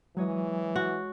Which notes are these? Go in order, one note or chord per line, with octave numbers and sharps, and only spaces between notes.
E3 F#3 G#3 C#5 D#5
F#4